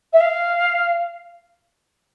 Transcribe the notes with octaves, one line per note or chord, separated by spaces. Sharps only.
E5
F5